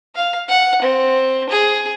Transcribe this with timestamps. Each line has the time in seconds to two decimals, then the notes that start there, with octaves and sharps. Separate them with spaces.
0.15 F5
0.48 F#5
0.82 C4
1.49 G#4